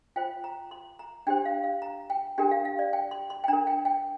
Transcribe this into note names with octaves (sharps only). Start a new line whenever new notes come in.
F4 C5 G5
A#5
C6
A#5
D4 G4 C5 G5
F5
F5
A#5
G5
D4 G4 A#4 G5
F5
F5
D5
G5
C6
C6
G5
D4 A#4 A#5
G5
G5